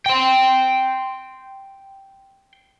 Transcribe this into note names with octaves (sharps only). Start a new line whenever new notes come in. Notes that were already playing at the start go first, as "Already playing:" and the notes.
G5 C6